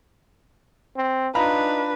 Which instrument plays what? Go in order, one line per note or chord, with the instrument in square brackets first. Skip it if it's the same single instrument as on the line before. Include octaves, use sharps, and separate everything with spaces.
[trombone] C4
[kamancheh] D4 B4 [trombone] D#4 [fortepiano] F4 A#5 B5